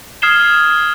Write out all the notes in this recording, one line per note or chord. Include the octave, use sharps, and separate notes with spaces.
D#6 F6 G#6 C7 E7 G7